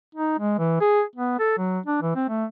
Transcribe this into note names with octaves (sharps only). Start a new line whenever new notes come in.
D#4
G#3
E3
G#4
B3
A4
F#3
D4
E3
C4
A3